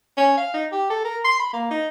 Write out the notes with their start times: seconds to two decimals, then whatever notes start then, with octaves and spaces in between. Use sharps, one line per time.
0.17 C#4
0.37 F5
0.54 D#4
0.72 G4
0.90 A4
1.05 A#4
1.25 C6
1.39 B5
1.53 A#3
1.71 D#4